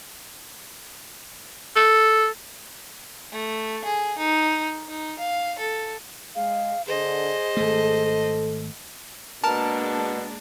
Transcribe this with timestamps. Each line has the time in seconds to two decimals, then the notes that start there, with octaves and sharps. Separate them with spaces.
1.76 A4
3.32 A3
3.85 G#4
4.18 D#4
4.88 D#4
5.18 F5
5.58 A4
6.35 G#3 F5
6.87 D3 G#4 C5 D#5
7.57 G#1 A3 A4
9.44 B2 G#3 A#3 D4 A#4 A5